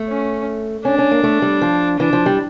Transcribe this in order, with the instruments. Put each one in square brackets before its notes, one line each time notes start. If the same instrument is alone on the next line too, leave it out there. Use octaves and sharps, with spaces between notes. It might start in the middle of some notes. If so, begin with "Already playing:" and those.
Already playing: [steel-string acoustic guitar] A3
[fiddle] C#4
[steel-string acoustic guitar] C#4 [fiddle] D4
[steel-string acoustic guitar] C#4
A#3
A3
G3
F3
[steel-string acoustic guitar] E3 [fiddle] D4
[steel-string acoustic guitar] F3
G3